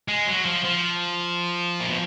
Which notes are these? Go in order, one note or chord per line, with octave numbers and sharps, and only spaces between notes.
G#3
F#3
F3
F3
A#2
B2